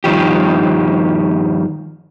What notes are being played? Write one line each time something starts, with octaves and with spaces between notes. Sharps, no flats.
G2 D#3 F3 G4